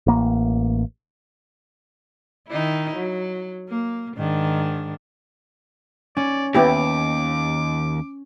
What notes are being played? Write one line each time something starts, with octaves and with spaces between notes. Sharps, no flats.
A1 A#3
D#3 D#4 E4
F#3
A#3
G#2 D#3 D4
C#4 D5
D#2 B3 E4 G4 D6